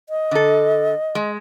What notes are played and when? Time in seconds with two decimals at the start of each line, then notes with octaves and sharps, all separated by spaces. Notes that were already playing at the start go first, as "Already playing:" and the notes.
0.09 D#5
0.31 D3 A4
1.15 G#3